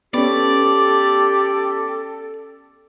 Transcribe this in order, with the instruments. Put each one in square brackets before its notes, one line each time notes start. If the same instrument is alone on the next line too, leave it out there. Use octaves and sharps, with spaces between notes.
[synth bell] B3 C#4 [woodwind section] G4 [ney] A4 [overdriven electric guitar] D5